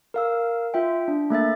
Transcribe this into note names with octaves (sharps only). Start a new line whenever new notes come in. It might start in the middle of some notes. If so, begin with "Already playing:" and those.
A#4 F5 E6
F4 E5 G5
D4
A3 A#3 E5 A6